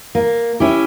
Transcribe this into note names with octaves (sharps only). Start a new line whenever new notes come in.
A#3
C#4 E4 G4